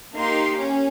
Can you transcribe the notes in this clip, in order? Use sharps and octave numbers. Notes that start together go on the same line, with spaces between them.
A#3 D#4 G4 C6
C#4